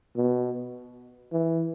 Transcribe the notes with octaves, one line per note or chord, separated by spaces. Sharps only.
B2
E3